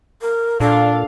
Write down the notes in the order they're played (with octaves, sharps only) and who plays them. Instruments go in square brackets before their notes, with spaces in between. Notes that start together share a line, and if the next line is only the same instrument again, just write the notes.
[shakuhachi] A#4
[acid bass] A#2 [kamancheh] D4 [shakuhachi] A4 [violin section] F5